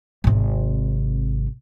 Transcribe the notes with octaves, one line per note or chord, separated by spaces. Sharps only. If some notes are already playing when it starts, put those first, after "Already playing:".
G#1 C3